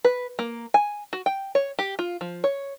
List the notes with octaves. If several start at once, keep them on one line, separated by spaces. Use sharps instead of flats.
B4
A#3
G#5
F#4
G5
C#5
G4
F4
F3
C#5